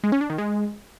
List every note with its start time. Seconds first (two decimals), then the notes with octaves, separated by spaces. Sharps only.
0.04 G#3
0.12 C#4
0.21 D4
0.30 D#3
0.38 G#3